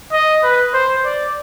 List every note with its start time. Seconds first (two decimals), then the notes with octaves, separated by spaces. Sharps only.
0.12 D#5
0.44 B4
0.74 C5
1.05 D5